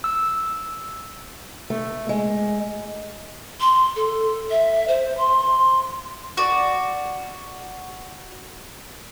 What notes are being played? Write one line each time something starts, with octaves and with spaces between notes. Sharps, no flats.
E6
A3
G#3
C6
A4
E5
C5
C6
F#4 D5